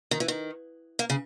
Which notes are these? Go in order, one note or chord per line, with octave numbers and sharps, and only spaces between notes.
D#3
E3
D#3
A#3
C#3